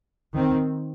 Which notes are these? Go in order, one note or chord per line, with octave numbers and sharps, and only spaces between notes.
D#3 C4